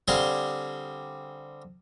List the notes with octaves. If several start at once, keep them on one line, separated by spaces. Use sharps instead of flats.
D3 G3 C4 G#4 F5 C6